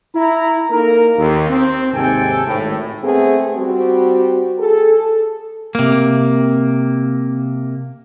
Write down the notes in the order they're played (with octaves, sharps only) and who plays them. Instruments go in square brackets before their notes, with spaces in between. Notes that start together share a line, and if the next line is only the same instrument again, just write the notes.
[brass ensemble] E4 A#5
A#3 D#4 A4 A#4
D#2
C4
D#2 G#2 C3 A4 G5 G#5
G#1 A2
[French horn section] A3 B3 C4 G#4
G3 C4 F#4
G#4 A4
[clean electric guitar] C3 A#3